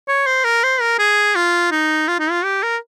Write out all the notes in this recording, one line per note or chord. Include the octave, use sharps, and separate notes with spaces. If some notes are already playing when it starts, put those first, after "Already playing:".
C#5
C5
A#4
C5
A#4
G#4
F4
D#4
F4
D#4
F4
G4
A#4